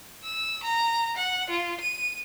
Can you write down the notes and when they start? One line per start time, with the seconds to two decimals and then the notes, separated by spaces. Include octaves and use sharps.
0.24 E6
0.63 A#5
1.17 F#5
1.50 F4
1.81 D#7